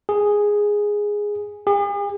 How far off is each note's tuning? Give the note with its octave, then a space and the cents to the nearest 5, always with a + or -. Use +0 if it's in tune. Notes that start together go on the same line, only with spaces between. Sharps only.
G#4 -5
G#4 -45